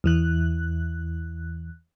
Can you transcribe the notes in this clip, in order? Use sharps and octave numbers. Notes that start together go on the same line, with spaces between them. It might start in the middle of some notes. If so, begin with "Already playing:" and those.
E2 E3 F#6